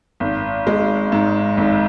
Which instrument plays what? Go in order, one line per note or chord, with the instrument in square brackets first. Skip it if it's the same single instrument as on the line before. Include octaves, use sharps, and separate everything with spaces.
[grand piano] G#1
G#3
G#2
G#1